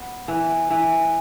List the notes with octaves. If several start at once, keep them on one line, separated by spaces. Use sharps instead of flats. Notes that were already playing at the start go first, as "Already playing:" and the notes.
Already playing: B3
E3
E3